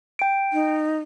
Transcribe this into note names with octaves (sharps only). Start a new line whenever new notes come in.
G5 D7
D#4